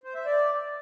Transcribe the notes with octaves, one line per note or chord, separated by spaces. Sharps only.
C5
E5
D5